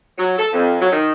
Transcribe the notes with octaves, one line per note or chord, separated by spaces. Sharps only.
F#3
A4
F2
F#3
D#3